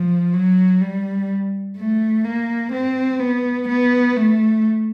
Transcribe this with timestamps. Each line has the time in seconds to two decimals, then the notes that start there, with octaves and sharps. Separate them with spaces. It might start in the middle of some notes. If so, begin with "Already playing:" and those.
Already playing: F3
0.34 F#3
0.81 G3
1.77 A3
2.24 A#3
2.73 C4
3.20 B3
3.68 B3
4.16 A3